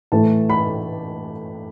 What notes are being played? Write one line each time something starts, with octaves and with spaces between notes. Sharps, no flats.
A2 E3 A3 A5
B5